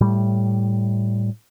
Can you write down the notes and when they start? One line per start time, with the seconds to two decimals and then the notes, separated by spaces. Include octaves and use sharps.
0.01 A2 G3